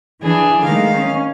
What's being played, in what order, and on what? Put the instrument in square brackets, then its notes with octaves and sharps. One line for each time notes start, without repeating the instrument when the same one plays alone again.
[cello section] E3 [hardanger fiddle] D4 G#4
[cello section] D#3 G#3 A3 [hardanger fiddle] F5
[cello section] C#4